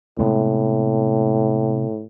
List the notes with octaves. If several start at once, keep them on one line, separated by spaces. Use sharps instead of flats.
A2 C3 G#3 B3